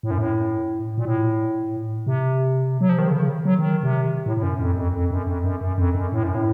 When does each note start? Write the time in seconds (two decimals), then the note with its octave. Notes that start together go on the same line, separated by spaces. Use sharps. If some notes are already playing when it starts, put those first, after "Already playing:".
0.03 A2
0.11 F#2
0.18 A2
0.98 A#2
1.05 A2
2.07 C3
2.81 F#3
2.89 F3
2.98 D#3
3.08 C#3
3.14 D#3
3.20 C#3
3.45 F#3
3.59 D#3
3.83 C3
4.26 A2
4.37 A2
4.43 F#2
4.60 F2
4.76 F2
4.93 F2
5.11 F#2
5.27 F2
5.44 F#2
5.61 F#2
5.78 F2
5.95 F#2
6.12 A2
6.23 F#2
6.35 A2